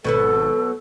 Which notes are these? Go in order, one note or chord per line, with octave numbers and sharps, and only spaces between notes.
G#1 B2 F#3 B3 A4